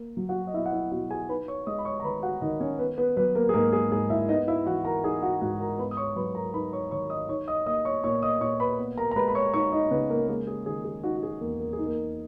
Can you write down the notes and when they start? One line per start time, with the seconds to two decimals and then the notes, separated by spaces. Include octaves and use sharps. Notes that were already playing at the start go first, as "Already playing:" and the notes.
Already playing: A#3
0.17 F#3
0.29 F#4 F#5
0.47 D#5
0.54 B2 E4 E5
0.66 F#5
0.73 E4 E5
0.92 B2 F#4 F#5
1.10 G#4 G#5
1.29 D#4 B4 B5
1.48 C#5 C#6
1.67 G#3 D#5 D#6
1.78 B5
1.85 C#5 C#6
2.00 A#5
2.04 D#3 B4 B5
2.23 F#4 F#5
2.42 D#3 D#4 D#5
2.60 C#4 C#5
2.79 B3 B4
2.98 B3 B4
3.17 F#3 B3 B4
3.35 A#3 A#4
3.49 G#4
3.54 G#2 A#3 A#4
3.72 G#4
3.92 G#2 G#4
4.10 E4 E5
4.29 B3 D#4 D#5
4.48 E4 E5
4.66 E3 F#4 F#5
4.85 A#4 A#5
5.04 D#4 G#4 G#5
5.22 F#4 F#5
5.41 G#2 F#4 F#5
5.60 A#4 A#5
5.79 B3 B4 B5
5.91 D#6
5.97 C#5 C#6
6.16 F#3 B4 B5
6.35 A#4 A#5
6.53 D#4 B4 B5
6.72 C#5 C#6
6.91 D#3 C#5 C#6
7.10 D#5 D#6
7.29 D#4 C#5 C#6
7.48 D#5 D#6
7.66 A#3 D#5 D#6
7.85 C#5 C#6
8.03 A#2 C#5 C#6
8.22 D#5 D#6
8.41 A#2 C#5 C#6
8.60 B4 B5
8.79 B3
8.97 A#4 A#5
9.11 A#5
9.16 G#3 B4 B5
9.28 B5
9.35 C#5 C#6
9.53 D#4 C#5 C#6
9.72 D#4 D#5
9.91 C#3 B3 B4
10.10 A#3 A#4
10.28 G#3 A#3 A#4
10.47 G#4
10.66 D#3 G#4
10.84 G#4
11.04 D#4 F#4
11.17 F#4
11.23 G#4
11.41 E2 A#3 A#4
11.60 A#4
11.73 G#4
11.78 D#4
11.86 A#3 A#4